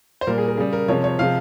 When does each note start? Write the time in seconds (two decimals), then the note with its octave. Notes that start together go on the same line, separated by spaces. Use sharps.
0.21 C5
0.27 A#2 G3 A#4
0.38 G#4
0.48 A#4
0.57 C#3 G3 G#4
0.73 A#4
0.88 C3 F3 G#3 C#5
1.04 C#5
1.19 C3 F3 G#3 F5